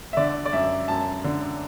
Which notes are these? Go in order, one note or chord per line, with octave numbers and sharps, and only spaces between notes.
E5
D3 D5
D5
F#2 E5
F#2 A5
D3